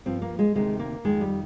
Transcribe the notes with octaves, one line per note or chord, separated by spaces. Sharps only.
G2 F3 C4
A#3
G#3
D2 C3 D#3 G#3
A#3
F2 D#3 G#3
G3